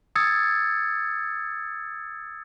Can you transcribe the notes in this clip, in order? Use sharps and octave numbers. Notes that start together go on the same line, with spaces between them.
D#6 E6 G#6 A6 C#7